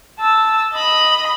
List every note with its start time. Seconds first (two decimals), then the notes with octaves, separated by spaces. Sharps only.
0.19 A5 E6
0.73 D#5 B5